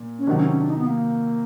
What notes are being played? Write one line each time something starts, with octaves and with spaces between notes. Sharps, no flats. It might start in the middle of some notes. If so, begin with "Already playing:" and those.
Already playing: A#2
C#4
C3 D#3 F#3 D4
C#4
C#4
D4
D#4
B3
A#3